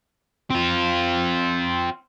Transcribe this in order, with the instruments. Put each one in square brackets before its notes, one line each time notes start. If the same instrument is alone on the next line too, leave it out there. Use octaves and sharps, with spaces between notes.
[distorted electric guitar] C4 F4